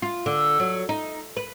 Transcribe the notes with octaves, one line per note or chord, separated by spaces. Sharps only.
F4
D3
F#3
D#4
B4